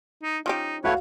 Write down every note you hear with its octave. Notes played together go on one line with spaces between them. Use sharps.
D#4
F3 C#4 D#4 G4
A3 E4 F#4 B4 C#5 F5 F#5